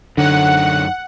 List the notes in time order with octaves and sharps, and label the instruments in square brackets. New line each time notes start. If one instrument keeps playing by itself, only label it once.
[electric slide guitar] F#2 D#4 C#5 [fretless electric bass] D3 [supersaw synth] F#5